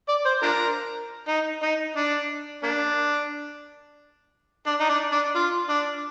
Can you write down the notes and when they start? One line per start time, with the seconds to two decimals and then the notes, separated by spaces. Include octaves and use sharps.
0.09 D5
0.26 C5
0.43 D4 F4 A#4
1.28 D#4
1.62 D#4
1.96 D4
2.63 A#3 D4
4.67 D4
4.80 D#4
4.89 D4
5.12 D4
5.35 F4
5.69 D4